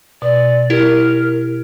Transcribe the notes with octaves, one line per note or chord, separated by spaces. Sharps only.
B2 D5
E4 G4 A#4